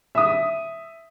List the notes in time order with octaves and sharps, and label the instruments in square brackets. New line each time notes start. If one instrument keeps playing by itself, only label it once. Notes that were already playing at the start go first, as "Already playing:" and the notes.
[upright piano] E5 D#6